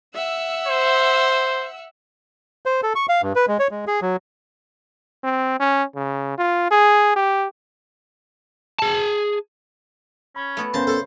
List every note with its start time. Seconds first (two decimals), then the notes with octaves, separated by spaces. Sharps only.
0.14 E5 F#5 E6
0.67 C5
2.66 C5
2.83 A4
2.95 C#6
3.09 F5
3.22 G2
3.36 B4
3.48 G#3
3.59 C#5
3.71 G#3
3.87 G#4
4.02 F#3
5.24 C4
5.60 C#4
5.95 C#3
6.38 F4
6.71 G#4
7.16 G4
8.79 G#4 A5
10.36 C#4 B5
10.57 A3 B3 F#4
10.74 C#3 B3 C#4 A#4 C5 A5
10.87 A4